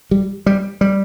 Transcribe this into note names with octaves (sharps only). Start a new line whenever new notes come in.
G3
G3
G3